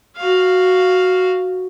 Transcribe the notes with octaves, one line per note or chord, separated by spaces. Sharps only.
F#4 F5